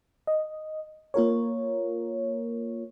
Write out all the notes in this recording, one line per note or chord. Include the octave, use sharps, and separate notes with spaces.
D#5
A#3 F4 A#4 C#5